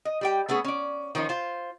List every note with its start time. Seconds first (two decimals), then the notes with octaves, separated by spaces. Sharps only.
0.05 D#5
0.21 G3 G4 G5
0.49 A3 B3 C#4 G#4
0.64 C#4 D5
1.15 D#3 F3 C#4 D#4
1.29 F4 C5